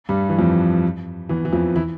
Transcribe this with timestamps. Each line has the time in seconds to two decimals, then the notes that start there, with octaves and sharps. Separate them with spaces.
0.09 G2 G3
0.29 E3
0.38 F2 F3
1.29 E2 E3
1.45 E3
1.53 F2 F3
1.76 E3 E4